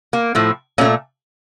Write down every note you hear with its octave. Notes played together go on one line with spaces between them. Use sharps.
A#3
A2 F3 A3
A#2 A3 A#3 C#4